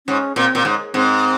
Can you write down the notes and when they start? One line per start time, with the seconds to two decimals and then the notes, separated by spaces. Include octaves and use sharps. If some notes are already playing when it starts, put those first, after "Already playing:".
0.07 G#2 C#4
0.36 A#2 C4
0.55 A#2
0.65 G#2
0.94 G#2 C4